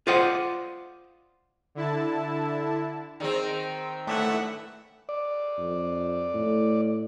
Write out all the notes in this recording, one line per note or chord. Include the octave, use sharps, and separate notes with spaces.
F4 C5 D5 D#5 F#5
D3 E4 A5
D#3 C4 G#4 D5
A2 D3 E3 A3 E5 F#5
D5
F2
A2